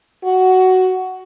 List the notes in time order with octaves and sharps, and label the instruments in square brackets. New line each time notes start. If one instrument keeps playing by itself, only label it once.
[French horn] F#4